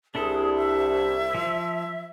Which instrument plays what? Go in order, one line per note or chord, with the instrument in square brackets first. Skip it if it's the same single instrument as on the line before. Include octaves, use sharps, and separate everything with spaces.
[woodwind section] C2 [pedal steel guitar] D4 E4 A4 [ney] G#4
[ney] E5
[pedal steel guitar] F3